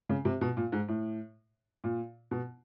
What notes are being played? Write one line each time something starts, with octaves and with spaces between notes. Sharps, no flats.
C#3
C3
B2
A#2
G#2
A2
A#2
B2